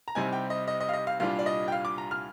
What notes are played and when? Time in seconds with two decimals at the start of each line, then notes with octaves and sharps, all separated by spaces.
0.08 A#5
0.15 C2 C3 G3 C4 D#4 G#5
0.33 G5
0.50 D#5
0.68 D#5
0.81 D#5
0.89 F5
0.93 D#5
1.07 F5
1.20 C2 A#2 G3 D4 F4 F5
1.39 D5
1.46 D#5
1.68 G5
1.72 F5
1.85 D6
1.98 A#5
2.11 F6